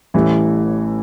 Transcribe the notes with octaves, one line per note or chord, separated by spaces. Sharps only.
A1 A2 E3 G3 E4